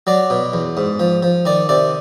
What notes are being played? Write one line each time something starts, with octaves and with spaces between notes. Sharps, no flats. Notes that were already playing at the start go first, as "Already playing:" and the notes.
F#3 D5
B2
E2
G#2
F3
F3
D#3 D5
C3 D5